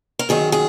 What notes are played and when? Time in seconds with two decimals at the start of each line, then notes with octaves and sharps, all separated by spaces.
0.19 A#4
0.29 F#2 D#3 F#3 G#4
0.52 G#4